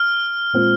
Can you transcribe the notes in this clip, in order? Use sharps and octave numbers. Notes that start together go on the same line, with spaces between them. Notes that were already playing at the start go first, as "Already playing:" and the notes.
Already playing: F6
A#2 G#3 C4 F4